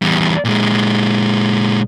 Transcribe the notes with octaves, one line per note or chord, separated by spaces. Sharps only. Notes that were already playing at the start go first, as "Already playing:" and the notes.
E2 G3
A#2 G#3